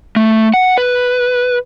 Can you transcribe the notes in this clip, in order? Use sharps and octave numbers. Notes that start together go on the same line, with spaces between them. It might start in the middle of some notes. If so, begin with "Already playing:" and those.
A3
F#5
B4